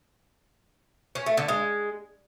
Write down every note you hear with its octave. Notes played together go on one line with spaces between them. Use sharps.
C#4
A3
D3
G#3